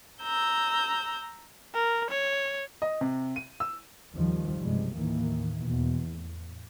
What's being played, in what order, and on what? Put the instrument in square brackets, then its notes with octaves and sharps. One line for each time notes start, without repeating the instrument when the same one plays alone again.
[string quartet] A#5 E6 G6
[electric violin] A#4
C#5
[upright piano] D#5
C3
D#7
E6
[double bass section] D#2 D#3 F3 G3
B1 G2 C3 G3 G#3
D#2 A2 D#3 E3 A#3
E2 B2
A2